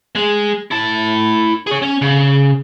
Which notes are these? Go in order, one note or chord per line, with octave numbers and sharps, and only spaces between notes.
G#3
E4 A5
G#4 C#5
C#4
C#3